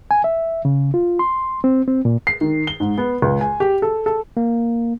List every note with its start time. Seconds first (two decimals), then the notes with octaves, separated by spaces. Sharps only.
0.11 G#5
0.24 E5
0.65 C#3
0.94 F4
1.19 C6
1.64 C4
1.87 C4
2.05 A#2
2.27 C7
2.41 D#3
2.67 G7
2.80 G#2
2.98 B3
3.22 C#2
3.41 G#5
3.60 G4
3.82 A4
4.06 A4
4.37 A#3